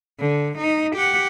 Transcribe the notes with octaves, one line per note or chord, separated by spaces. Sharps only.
D3
D#4
G4 F#5